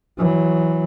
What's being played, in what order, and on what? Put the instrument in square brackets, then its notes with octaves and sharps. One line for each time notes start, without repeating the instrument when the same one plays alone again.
[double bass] E3 F#3